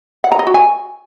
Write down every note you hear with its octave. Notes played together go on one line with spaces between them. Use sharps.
F#5
A#5
D#5
F#4
G#5